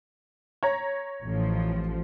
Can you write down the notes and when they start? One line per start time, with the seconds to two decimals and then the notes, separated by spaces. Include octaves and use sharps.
0.63 C#5 A#5
1.23 A1 F3